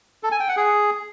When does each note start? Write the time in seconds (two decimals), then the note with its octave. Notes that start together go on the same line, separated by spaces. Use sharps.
0.23 A4
0.32 G#5
0.40 G5
0.48 F#5
0.57 G#4